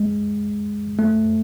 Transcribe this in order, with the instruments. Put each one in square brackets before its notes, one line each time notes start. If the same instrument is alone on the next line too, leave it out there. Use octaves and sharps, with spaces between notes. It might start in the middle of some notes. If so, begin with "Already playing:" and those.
Already playing: [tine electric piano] G#3
A3